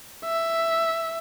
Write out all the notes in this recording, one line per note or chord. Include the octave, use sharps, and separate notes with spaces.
E5